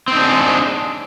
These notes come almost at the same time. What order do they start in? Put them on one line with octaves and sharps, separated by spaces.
C4 D#4 D4 G#4